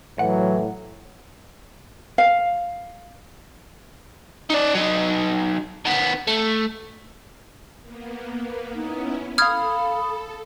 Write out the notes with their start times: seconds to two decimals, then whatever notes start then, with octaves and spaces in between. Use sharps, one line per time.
0.19 A2 E3 F#3 F#5
2.18 F5
4.50 D#4 D5
4.75 F#3 D#4
5.85 D#3 B3
6.27 A3
7.82 A#3 B3
8.74 B3 C#4 D#4 E4
9.38 A4 F5 B5 D#6 F6 G#6